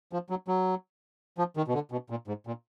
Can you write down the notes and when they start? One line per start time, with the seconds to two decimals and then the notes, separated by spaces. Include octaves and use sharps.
0.13 F3
0.30 F#3
0.48 F#3
1.38 F3
1.57 D#3
1.68 B2
1.74 D3
1.92 B2
2.10 A#2
2.28 G#2
2.47 A#2